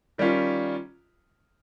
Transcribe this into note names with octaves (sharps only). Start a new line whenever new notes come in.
D#3 G3 C#4 F4